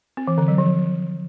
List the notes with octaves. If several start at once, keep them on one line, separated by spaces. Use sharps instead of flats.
C4
E3
D3
F#3
F3